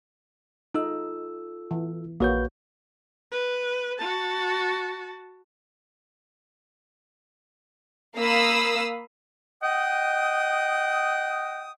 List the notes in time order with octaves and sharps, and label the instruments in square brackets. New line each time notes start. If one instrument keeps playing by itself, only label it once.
[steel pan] D#4 [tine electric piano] F4 A4 E6
[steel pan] E3
[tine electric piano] A#1 B4 G6 [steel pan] A#3 F#4 C#5
[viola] B4
F#4 A5
[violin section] A#3 F5 B5 D#6 E6
[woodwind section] D#5 F#5 G5 D#6